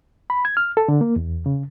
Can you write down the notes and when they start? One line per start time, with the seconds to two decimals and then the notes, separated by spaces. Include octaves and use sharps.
0.30 B5
0.45 G#6
0.57 F6
0.77 A4
0.88 D3
1.01 A#3
1.16 E2
1.46 C#3